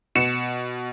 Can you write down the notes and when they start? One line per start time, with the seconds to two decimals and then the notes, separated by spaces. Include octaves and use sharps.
0.15 B2 C#7 E7